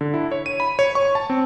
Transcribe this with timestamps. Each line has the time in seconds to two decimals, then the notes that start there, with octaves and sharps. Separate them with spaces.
0.01 D3
0.14 E4
0.32 C#5
0.46 D#7
0.60 B5
0.79 C#5
0.95 C#6
1.15 A5
1.30 C4